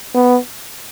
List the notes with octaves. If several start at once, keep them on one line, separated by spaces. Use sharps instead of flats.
B3